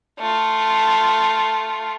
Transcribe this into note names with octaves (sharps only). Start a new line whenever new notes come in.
A3 F4